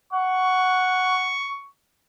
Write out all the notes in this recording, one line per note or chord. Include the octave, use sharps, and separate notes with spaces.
F#5 C#6